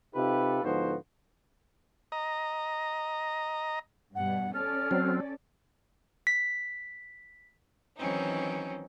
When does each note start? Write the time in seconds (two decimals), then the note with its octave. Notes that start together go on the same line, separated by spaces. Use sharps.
0.15 C3 D#4 F4 G4 A4 B4
0.63 G#2 D3 F3 B3 F#4 C5
2.12 D#5 A#5
4.15 G2 B2 F#5
4.54 C#4 A4 D5 F6
4.91 F#3 C4
6.27 B6
7.98 D#3 E3 F#3 C4 C#4 D#4